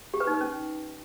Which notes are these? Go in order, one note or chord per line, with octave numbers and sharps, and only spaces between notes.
G4
B4
D#4
B4
C#4